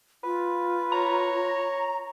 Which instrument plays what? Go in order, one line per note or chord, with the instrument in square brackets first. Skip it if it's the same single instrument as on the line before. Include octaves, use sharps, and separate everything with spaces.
[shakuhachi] F4 [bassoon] B4
[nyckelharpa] C#5 [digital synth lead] A#5